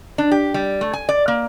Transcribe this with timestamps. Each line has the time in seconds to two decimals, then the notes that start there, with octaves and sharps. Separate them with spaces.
0.18 D4
0.31 G4
0.54 G3
0.81 A3
0.93 G#5
1.09 D5
1.28 A#3